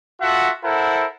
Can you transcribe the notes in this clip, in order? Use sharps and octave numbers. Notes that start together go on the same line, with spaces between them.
F4 F#4 A4 E5 F#5
E4 A4 A#4 C5 F#5